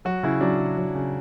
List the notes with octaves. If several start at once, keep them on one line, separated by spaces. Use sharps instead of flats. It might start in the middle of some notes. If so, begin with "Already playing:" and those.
F#3 F#4
C#3 E4
F#3 D4
C#3
F#3
C#3